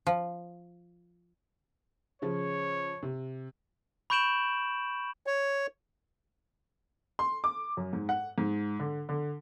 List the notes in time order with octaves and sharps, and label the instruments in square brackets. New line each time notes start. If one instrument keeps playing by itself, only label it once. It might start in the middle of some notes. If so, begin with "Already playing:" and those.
[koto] F3
[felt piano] C#3 F3 [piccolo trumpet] C#5
[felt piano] C3
[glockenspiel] B5 C#6 G6 D7 E7 F#7
[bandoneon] C#5
[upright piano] C6
D6
F#2
G#2
F#5
G#2
D3
D3